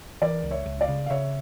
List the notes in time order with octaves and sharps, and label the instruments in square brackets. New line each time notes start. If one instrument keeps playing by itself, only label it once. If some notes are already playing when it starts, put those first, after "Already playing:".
[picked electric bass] E3 [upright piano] A#4 D5
[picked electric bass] C#2
[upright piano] C#5 E5
[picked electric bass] C#2
[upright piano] D5 F5
[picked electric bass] C#3
[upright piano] F5
[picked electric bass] C#3 [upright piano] C#5 E5